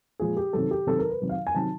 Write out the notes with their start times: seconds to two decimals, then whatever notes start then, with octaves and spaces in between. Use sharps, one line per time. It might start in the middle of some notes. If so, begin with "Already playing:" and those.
0.19 A#2 F3 G#3 G#4
0.37 G4
0.53 C3 D#3 F#3 A4
0.71 G4
0.87 C3 D#3 F#3 A4
0.99 A#4
1.10 B4
1.22 C3 D#3 F#3
1.29 F5
1.47 G#5
1.55 C3 D#3 F#3 A5